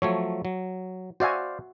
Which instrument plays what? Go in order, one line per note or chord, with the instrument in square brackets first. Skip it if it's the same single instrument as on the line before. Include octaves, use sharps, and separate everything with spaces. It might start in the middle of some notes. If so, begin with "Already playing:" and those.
[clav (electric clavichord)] F3 F#3 A3 [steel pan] C#5
[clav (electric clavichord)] F#3
[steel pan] F#4 E5 G#5 [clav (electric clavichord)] C5 D5 F5